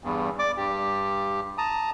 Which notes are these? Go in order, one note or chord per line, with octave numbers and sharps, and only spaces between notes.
E2 G2
D5 D6
G2 G4
A5 A#5 D#6